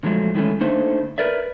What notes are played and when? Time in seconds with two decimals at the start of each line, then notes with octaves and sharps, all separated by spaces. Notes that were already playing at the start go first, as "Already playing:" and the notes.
0.03 A#2 D3 F3 F#3 G#3 A3
0.35 D#3 E3 G#3 A3 C#4
0.61 D3 A3 A#3 D#4 C5
1.18 A#4 B4 D5 E5